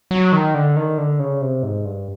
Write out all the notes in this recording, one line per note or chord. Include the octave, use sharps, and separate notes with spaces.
F#3
D#3
D3
D#3
D3
C#3
C3
G#2
G2